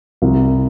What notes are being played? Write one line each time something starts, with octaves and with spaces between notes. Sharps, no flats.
C2